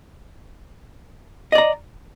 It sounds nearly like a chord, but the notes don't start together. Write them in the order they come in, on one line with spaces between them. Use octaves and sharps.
D#5 D5 A#5